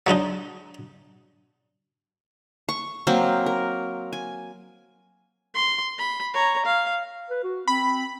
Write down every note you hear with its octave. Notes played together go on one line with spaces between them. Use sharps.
F#3 G#3 D4 D#4
C#6
F#3 A#3 C4
A#4
G#5
C6
B5
C#5 A#5
F5
B4
F#4
C4 B5